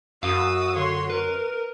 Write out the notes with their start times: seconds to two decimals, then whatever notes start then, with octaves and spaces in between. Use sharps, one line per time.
0.23 F#2 F#4 F5 D#6 E6
0.76 D3 C#5 C6
1.10 A#4 B4